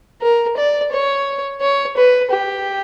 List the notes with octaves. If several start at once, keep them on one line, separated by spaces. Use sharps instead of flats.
A#4
D5
C#5
C#5
B4
G4